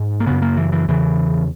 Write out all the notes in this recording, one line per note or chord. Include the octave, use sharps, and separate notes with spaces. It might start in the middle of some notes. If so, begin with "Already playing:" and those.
Already playing: G#2
A#3
F#2 C#3 B3
A#3
E3
E3
E2 C#3 E3